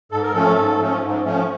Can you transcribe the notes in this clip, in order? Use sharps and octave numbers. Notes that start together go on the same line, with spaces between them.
G#2 A4
A#4
F3 A3 C#4 A4
G#2
F3 A3 C#4
G#2
F3 A3 C#4